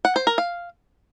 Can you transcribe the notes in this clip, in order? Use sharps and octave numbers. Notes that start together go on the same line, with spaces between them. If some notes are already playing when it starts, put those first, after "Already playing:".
F#5
C5
A#4
F5